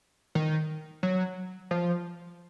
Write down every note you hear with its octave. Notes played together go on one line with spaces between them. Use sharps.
D#3
F#3
F3